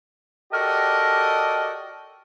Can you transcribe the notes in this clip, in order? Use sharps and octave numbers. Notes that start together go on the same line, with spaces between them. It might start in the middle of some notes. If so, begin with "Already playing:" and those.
F#4 G4 A4 A#4 D5 D#5